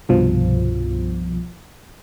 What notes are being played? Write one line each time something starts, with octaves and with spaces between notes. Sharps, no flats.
C2 G2 B2 F3